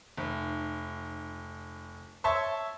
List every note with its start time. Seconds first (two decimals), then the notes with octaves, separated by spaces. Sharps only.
0.17 F1
2.24 C#5 E5 A5 C6 C#6